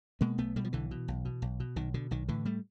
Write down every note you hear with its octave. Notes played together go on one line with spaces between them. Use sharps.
B2 G#3 A#3
B1 A3 B3
B2 G3 A3
F3
B1 D3 E3
B2
B1
B2
B1
B2
B1 D#3
B2 D3
B1 D#3
A2 D3 E3
G3 A3